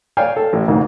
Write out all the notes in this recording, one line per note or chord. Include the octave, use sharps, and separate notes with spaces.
C#5 D5 F5 G5 G#5
A4
A1
D2 G#2 A#3